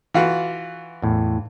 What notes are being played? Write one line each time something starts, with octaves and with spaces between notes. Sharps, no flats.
E3 F4 F#4
E2 A2